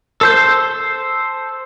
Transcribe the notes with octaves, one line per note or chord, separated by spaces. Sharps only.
A4 C5 G6